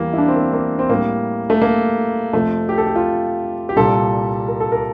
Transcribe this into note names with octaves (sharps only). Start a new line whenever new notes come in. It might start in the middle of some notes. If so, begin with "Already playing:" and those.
Already playing: E2 E3 G3 A#3
E4
D4
C4
A#3
A#3
C4
A2 G3 A#3
A3
A#3
F2 C3 F3 A3
G4
A4
G4
F4
G4
C2 A#2 G3 A4
A#4
A4
A#4